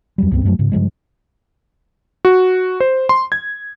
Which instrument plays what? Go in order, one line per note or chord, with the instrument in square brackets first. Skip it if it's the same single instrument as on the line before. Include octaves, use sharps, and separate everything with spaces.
[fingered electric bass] F2 F#3 G3
C#2 G2 B3 C4
F#2 F3 F#3 A3
G#2 C#3
G2 C#3 F3 G#3
[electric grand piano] F#4
C5
C6
G#6